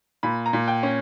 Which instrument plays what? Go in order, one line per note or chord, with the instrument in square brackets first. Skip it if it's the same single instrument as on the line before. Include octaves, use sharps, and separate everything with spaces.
[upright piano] A#2 B5
A#5
A#2
G5
C#4